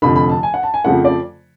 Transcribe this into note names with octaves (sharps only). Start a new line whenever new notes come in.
F1 F2 D3 B5
B5
A5
G#5
F#5
A5
G#5
F2 C#3 F3 A3 F#5
D5